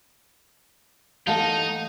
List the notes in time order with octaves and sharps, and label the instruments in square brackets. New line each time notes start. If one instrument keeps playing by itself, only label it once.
[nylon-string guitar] E3 A3 A#3 [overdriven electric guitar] D#4 [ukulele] F5 F#5 A5